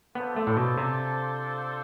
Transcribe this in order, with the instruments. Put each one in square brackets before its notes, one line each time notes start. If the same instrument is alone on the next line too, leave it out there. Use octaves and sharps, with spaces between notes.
[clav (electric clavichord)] B3 [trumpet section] D4 F4 A4 C5
[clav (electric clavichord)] A3
A2
B2
C3